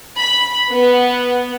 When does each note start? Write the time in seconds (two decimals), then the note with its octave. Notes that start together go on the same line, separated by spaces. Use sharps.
0.18 B5
0.69 B3